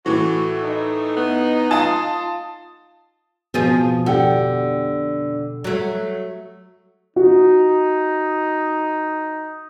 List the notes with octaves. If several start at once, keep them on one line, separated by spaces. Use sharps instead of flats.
A2 E3 A3 F#4
D#4
B3
F4 A5 D#6
F2 B2 F3 F4 G#4
D3 G4 F#5
F#3 A3
D#4 F#4